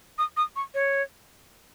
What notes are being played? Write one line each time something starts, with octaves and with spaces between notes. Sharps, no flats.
D#6
D#6
C#6
C#5